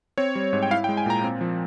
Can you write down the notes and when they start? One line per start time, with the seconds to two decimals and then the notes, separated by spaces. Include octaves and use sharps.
0.18 C4 C#5
0.35 G3
0.53 G#2
0.63 G5
0.71 E4 F5
0.84 G5
0.89 G#3
0.97 G#5
1.06 A#2 A#5
1.23 C4
1.41 F3